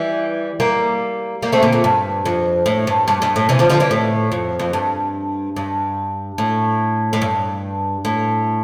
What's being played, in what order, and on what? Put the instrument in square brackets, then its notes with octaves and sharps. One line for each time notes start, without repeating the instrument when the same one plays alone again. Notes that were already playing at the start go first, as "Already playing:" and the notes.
Already playing: [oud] E3 G3
G3 A#3
G3 A#3
A3 C4
A#2 D3
A#2
G2
F2
A2
G2
G2
G2
A2
C3 E3
D3 F3
D3 F3
E3 G3
A2
F2
F2
G2
G2
A2
A2
G2
A2